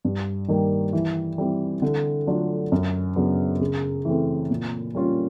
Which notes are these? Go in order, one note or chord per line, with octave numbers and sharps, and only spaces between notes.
G2
D#3 G3 A#3
E3
G3 C4 E4
D3
F#3 A3 D4 F4
F#2
C#3 F#3 B3 D4
C#3
E3 A3 C4
A#2
G3 A#3 C#4 F4